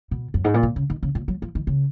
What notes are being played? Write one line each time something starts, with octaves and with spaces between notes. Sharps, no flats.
B2
F#2
G#2
A#2
B2
C#3
D#3
C#3
A#2
F#3
F3
D#3
C#3